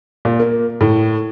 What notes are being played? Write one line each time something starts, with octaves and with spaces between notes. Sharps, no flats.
A#2
A#3
A2